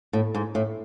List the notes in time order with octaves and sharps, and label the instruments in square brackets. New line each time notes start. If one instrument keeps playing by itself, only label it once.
[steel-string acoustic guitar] A2
G#2
A2